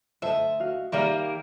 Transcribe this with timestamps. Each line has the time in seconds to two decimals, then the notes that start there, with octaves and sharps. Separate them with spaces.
0.22 D2 A4 C5 D#5 E5
0.60 F#4 F5
0.92 D#3 G3 A#3 G4 A#4 D5 E5 F5